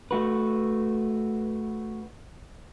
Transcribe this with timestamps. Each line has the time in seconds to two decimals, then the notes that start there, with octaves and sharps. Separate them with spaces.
0.11 A3 F#4 B4